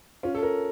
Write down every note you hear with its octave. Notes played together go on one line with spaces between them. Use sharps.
C#4 F4
A4
A#4